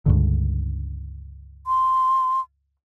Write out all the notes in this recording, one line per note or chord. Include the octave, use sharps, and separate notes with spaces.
C#2 G2 D3
C6